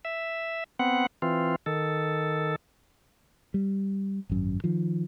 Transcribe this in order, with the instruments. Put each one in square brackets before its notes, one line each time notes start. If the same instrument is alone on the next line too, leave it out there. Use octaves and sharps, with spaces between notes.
[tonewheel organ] E5
B3 C4 F#5
E3 C4 F4
D#3 A4
[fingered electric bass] G3
G#1 F#2
D#3 F3